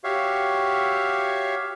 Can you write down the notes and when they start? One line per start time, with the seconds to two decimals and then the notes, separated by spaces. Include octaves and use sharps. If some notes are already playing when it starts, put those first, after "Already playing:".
0.04 F#4 G4 C#5 E5 F5